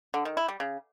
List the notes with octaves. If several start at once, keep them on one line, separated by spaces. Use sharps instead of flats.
D3
D#3
E4
G3
C#3